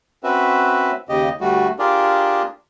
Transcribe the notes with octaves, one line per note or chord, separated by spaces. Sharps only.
C4 C#4 F#4 B4 E5
D#2 C#3 G4 D#5
D2 G3 A3 F#4
D4 F4 G4 G#4 A#4 D5